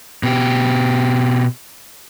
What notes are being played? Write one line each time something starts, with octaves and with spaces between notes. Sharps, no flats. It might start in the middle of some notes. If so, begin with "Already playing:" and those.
B2 G4